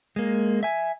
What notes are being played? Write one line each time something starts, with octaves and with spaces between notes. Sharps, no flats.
G#3 A#3
E5 G#5